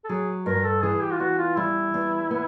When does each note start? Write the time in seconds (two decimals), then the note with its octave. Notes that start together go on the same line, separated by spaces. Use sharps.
0.04 A4
0.09 F#3 G#4
0.46 G2 A#4
0.65 A4
0.83 E3 G#4
1.01 G4
1.13 F4
1.20 E2 F#4
1.38 F4
1.57 G3 E4
1.94 E2
2.31 B3